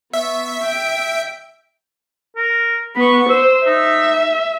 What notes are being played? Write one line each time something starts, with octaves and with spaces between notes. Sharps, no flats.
B3 E5 C#6
G5 D7
A#4
B3 B5 C#6
C5 E6
D#4 E5